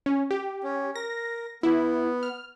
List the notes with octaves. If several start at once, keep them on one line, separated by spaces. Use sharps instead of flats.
C#4
G4
C#4
A#4 A#6
B3 E4
F6